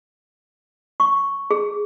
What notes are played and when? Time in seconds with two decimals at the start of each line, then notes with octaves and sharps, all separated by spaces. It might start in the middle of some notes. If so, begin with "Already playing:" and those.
1.00 C#6
1.51 G#4